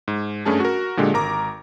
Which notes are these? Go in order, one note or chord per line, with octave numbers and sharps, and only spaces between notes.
G#2
G2 A3 C#4 G#4 A5
F#4 A#4
A#2 D3 G#3 G4
G#1 A#4 A#5 D6